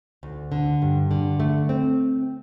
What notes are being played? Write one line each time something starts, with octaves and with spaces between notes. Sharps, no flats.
D2
D3
G2
D3
A3
C4